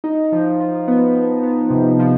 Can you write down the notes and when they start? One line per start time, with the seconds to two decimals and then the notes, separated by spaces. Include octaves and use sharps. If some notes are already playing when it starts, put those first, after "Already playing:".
0.04 D#4
0.32 F3
0.60 F3
0.88 B3
1.15 B3
1.43 B3
1.70 C3
1.99 F3